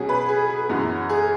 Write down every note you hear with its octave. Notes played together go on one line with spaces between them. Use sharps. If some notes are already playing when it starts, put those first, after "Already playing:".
Already playing: B2 F#3 C#4 G#4
B4
G#4
G#4
F#2 E3 B3
G#4